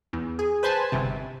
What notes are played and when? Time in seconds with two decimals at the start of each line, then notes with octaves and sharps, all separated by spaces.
0.13 E2
0.39 G#4
0.63 B4 C5 G#5 A5 B5
0.92 G1 C3